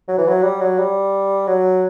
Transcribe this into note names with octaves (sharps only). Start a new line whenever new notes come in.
F#3
E3
F#3
G3
F#3
G3
F#3